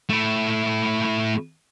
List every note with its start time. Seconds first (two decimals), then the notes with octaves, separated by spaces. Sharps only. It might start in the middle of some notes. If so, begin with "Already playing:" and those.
0.09 A3 E4